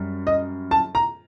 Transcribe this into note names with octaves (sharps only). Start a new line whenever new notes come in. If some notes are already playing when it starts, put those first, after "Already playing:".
Already playing: F#2 G3
D#5
A5
A#5